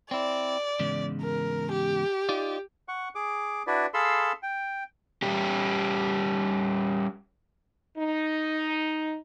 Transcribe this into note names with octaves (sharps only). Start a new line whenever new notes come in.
C4 E4 D5
E2 G#2 C#3
A#4
G4
D#4 F4 D5
F#5 C#6
G#4 D6
D4 E4 F#4 B4 D5
G#4 A4 F5 B5 C6 E6
G5
G3 C#4 G4
D#4